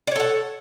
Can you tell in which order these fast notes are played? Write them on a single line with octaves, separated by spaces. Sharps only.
D5 C#5 A4 F#5